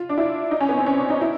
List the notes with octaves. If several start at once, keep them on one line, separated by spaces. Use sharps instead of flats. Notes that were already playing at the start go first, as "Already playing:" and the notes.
Already playing: F4
D4
E4
D#4
C#4
B3
C4
C#4
D4
D#4
E4